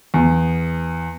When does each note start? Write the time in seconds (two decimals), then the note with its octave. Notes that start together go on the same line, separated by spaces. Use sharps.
0.14 E2